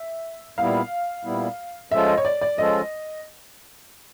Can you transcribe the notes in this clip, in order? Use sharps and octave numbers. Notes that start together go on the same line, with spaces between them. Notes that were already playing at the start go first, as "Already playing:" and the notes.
Already playing: E5
A#2 G3 B3 E4 F5
A#2 G3 B3 E4
F3 G#3 C#4 F4 A4 E5
D#5
C#5
D5
D5
F3 G#3 C#4 F4 A4 D#5